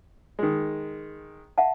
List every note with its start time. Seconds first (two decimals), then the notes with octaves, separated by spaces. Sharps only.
0.39 D#3 G#3
1.58 E5 F#5 A5